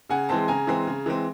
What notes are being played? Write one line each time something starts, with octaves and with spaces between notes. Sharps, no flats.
C#3 F#5 G#5
E3 G#3 C4 G5 A5
C#3 G#5 A#5
E3 G#3 C4
C#3
E3 G#3 C4